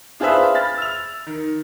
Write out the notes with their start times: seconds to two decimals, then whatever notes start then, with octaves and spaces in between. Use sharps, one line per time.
0.20 D4 F4 G#4 B4 C5 E5
0.54 B5 F6 A6
0.78 E6 F7
1.27 D#3